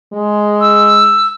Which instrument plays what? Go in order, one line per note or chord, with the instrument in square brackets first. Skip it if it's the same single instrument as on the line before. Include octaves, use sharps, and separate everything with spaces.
[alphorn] G#3
[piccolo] E6